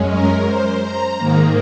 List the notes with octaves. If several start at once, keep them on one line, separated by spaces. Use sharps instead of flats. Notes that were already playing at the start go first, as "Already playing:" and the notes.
Already playing: F#2 G#3 C#4
A#4
C5
A#5
G#2 D#3 A#3